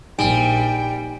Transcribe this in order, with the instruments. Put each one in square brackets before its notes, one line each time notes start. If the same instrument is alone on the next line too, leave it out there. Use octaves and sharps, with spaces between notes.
[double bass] A#1 [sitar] G3 [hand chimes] D#4 G#5 D7 [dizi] G5